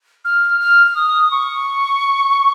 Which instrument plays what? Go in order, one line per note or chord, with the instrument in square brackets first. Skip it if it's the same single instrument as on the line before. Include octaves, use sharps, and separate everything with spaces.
[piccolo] F6
F6
F6
D#6
C#6